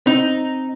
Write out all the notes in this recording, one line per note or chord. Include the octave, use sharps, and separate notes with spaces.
C4 D#4